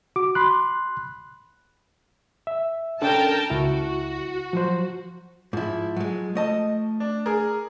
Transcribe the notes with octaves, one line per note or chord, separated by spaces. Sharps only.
F#4 D6
B5 C6 F#6
E5
C#4 D4 A4 A#4 G5 A5
C#2 E4 F#4
F3 F#3 C5
G#2 F3 E4
F#3 G#3
A3 D#5 A5
D4
G#4 A#4